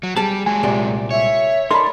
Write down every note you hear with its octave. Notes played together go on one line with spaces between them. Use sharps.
F#3
G3 G#4 A5
F#3 G#3 G#5
C2 A#2 G4
C#5 E5
D#4 A4 A#4 D5 B5 C6